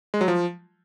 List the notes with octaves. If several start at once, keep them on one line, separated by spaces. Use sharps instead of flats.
G#3
F#3
F3